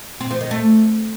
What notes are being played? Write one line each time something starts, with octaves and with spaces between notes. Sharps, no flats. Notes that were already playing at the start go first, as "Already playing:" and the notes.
C4
F3
D#3
A3